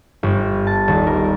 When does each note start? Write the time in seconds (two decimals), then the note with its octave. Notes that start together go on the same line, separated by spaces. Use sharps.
0.23 G1
0.67 A5
0.88 D#1
1.07 A#4